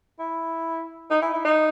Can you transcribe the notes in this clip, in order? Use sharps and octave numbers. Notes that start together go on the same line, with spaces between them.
E4
D#4
E4
E4
D#4